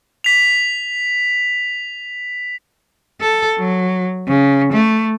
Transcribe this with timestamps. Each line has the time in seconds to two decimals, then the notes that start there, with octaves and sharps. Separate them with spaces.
0.24 B6 F7
3.21 A4
3.59 F#3
4.28 C#3
4.73 A3